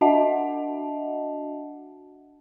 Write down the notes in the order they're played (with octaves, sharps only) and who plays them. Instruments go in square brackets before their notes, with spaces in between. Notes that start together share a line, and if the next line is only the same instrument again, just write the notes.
[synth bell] D4 F#4 D#5 E5 F#5 A5